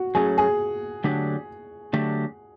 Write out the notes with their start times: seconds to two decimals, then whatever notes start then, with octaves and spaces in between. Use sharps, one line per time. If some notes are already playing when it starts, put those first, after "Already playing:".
Already playing: F#4
0.15 F#3 A3 C#4 G#4
0.38 G#4
1.04 D3 F#3 A3 D4 G4
1.93 D3 F#3 A3 D4 G4